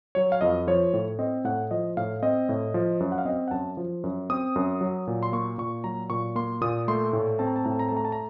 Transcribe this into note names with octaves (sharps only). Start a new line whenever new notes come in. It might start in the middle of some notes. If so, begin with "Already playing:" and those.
F#3 C#5
F5
F2 D#5
F3 C#5
A2
C4 D#5
A2 F#5
F3 D#5
A2 F5
C4 D#5
A2
F3
F#2
F#5
F5
C4 D#5
F#5
F#2 A5
F3
F#2
C4 D#6
F#2
F#3
A#2
C6
A#3 C#6
A#2 C#6
F#3 A#5
A#2 C#6
A#3 C6
A#2 D#6
A3 C6
A2
C4 A5
A#5
A5
A2 A#5
A5
A#5
A5
A3 A#5
A5
A#5